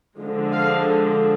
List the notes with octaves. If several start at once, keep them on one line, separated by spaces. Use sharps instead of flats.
D3 F3 G#3
F5